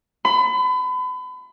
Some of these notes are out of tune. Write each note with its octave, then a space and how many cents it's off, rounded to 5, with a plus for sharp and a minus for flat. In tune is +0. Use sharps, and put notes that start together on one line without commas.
B5 +35